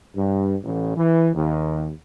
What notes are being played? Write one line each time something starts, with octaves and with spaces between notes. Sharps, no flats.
G2
A1
E3
D#2